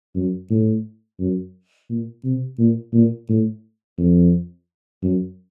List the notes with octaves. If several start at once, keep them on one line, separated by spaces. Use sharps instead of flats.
F#2
A2
F#2
A#2
C3
A#2
A#2
A2
F2
F#2